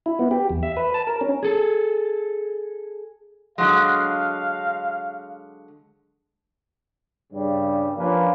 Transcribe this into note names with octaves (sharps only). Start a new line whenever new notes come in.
E4
B3
G4
E2
E5
B4
A5
A#4
C#4
G#4 A4
D3 F#3 G#3 F5
G2 C#3 G3
F3 A#3 C#4 D4 F4 B4